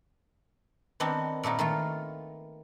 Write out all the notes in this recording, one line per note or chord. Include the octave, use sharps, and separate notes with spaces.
D#3 B3 C4 D4 D#4
A#2 A3 B3 D#4
D#3 A3 F4